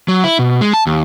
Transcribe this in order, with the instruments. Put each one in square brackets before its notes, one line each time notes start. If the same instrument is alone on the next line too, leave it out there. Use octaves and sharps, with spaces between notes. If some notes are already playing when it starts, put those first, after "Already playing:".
[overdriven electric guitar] F#3
E4
B2
G#3
A5
D#2